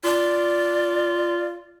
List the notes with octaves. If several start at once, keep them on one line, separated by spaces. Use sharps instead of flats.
F4 D5